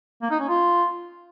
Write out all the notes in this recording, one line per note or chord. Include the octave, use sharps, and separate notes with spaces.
A#3
D#4
C#4
F4